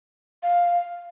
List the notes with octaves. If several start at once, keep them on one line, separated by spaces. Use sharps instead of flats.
F5